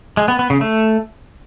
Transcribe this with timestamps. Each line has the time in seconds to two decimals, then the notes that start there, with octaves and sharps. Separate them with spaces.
0.17 G#3
0.28 B3
0.39 B3
0.50 C#3
0.61 A3